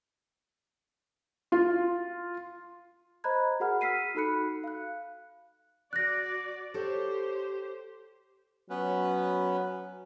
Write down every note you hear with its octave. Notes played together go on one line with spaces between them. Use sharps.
F4
C5 D#5 A#5 B5 F#6 G#6
F#4 G#4 A#4 F#5 B5 F6
E6 F6 B6 C7 D#7
D#4 F#4 A4 B5 F#6 C#7
F5 F#6
F#4 D5 F#6 A#6
G4 A4 C5 C#5
F#3 B3 C#4 B4